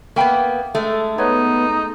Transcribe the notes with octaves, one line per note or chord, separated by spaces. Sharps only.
A#3 B3 E5 G5 B5
G#3 A3
B3 D#4 B4 C#5